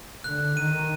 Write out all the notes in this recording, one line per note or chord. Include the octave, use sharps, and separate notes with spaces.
D3 F#6
D#3 D#7